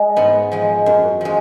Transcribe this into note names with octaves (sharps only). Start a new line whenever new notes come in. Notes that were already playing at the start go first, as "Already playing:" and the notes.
Already playing: G#3
G#2 B3
F3 G#3
F#2
F3 G#3